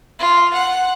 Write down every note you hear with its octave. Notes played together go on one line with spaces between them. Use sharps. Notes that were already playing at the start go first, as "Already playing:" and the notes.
F4
F#5